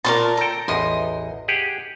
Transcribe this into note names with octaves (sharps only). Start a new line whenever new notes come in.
A#2 C#4 A#4 A5 C6
A4 G5 A#5
A1 E2 D#5 C6
G4 G#4 F#5